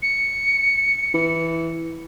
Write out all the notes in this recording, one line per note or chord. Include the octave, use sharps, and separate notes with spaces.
C#7
E3